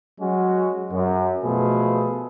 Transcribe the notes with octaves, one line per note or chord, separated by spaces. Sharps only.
F#3 G#3 C#4 F#4
F#2
B2 F3 A3 G#4 B4